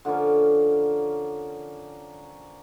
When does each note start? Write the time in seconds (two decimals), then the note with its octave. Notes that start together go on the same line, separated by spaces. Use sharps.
0.05 D3 F3 A#3 C#4